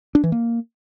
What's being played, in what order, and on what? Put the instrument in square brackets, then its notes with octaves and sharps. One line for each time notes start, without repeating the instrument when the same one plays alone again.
[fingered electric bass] D4
E3
A#3